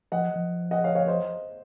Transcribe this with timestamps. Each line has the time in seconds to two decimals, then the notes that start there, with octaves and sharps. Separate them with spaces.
0.12 F3 D#5 F#5
0.36 F3
0.71 D#5 F#5
0.84 C#5 F5
0.95 C#5 F5
1.08 C5 D#5